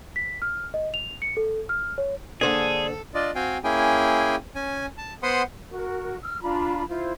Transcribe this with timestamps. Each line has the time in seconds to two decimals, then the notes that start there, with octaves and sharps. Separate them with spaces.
0.16 B6
0.42 F6
0.74 D#5
0.94 F7
1.22 C#7
1.37 A4
1.69 F6
1.98 C#5
2.41 D3 A#3 D4 G#4 A4 C5 F#5
3.14 D4 F4 D5 D#5
3.35 C4 F#4 F5 G5 G#5
3.64 A#3 C#4 E4 G#4 G5 G#5
4.55 C#4 G#5
4.98 A5
5.23 B3 C5 F#5 B5 C6 D#6
5.70 F#4 A#4
6.22 E6 F6
6.41 D4 F4 A#5 B5
6.89 E4 F4 C5